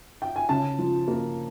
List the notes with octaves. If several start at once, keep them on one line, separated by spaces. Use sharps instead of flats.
G5
G#5
C#3 A5
F3
A#3